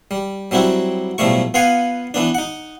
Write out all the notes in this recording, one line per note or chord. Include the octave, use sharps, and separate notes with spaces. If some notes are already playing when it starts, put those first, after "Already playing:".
G3
F#3 G3 C4 E4 F#4
B1 A2 F3 G3 A3 C#6
B3 F4 F5 F#5 G#5 B5
E3 B3 D4
D#4 F#5